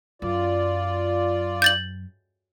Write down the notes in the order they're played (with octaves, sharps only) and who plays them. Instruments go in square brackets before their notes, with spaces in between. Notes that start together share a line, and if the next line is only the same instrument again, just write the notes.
[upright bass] F#2 [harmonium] F4 D5
[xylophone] G6 A6 F#7